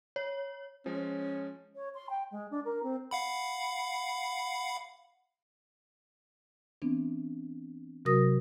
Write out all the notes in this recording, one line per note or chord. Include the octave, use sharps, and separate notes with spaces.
C#5
F3 G#3 C#4
C#5
C6
G5
G#3
D4
A#4
C4
F5 F#5 B5
E3 B3 C4 D4
C3 F#3 F#4 A#4 D#6 A#6